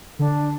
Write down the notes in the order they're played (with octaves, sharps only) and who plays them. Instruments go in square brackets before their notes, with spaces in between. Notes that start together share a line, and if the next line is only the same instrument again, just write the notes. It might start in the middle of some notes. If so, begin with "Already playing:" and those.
[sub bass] D3 [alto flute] D4